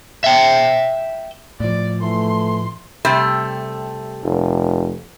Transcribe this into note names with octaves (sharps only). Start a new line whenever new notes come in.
E5 G5
A2 F3 D5
E3 A3 C6
C3 G3 A3
F1